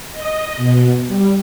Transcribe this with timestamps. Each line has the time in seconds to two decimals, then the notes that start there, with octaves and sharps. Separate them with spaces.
0.12 D#5
0.57 B2
1.07 G3